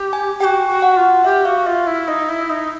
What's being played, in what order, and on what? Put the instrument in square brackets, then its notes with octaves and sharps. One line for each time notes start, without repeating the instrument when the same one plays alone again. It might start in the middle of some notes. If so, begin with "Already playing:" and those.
Already playing: [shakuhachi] G4
[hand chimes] G#5
[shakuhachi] F#4 G4 [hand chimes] G5
[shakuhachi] F#4
[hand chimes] F#5
[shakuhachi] F4
[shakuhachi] G4 [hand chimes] E5
[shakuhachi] F#4 [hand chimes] F5
[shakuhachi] F4 [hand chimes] E5
[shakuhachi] E4 [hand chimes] E5
[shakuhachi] D#4 [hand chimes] D#5
[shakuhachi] E4
D#4